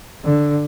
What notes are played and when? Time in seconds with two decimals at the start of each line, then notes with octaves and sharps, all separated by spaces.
0.24 D3